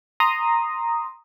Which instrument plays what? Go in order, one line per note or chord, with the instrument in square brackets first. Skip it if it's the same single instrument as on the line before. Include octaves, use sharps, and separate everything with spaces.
[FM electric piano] A#5 C6 D#6